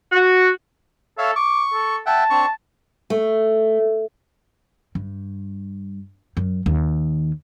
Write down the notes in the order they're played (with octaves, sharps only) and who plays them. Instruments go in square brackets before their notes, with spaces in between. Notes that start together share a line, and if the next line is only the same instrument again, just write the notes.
[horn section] F#4
[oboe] A4 [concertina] C#5 E5 F5
[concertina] C#6 [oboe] D6
[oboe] A4
[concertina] E5 F#5 G5 [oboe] A5
[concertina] C4 D4 C#6
[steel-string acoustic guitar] A3
[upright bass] G2
F#2
D#2